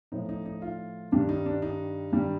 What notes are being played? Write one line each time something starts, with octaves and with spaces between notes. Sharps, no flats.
A2 F3 D#4
D#4
D#4
F4
G2 D#3 G3 D4
D#4
D4
D#4
G2 D#3 G3